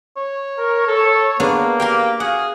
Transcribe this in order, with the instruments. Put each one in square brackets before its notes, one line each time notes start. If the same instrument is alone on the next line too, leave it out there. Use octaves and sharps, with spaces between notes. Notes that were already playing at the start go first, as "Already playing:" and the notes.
[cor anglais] C#5
[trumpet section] A#4
A4
[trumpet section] A#3 [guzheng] B3 D4 G#4
[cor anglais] G4 [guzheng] A#4 F5 G5
[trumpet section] F#4 F5 [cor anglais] G#4 [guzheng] F#5